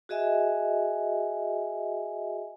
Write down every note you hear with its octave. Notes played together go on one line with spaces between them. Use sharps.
F#4 G#4 D#5 E5 G#5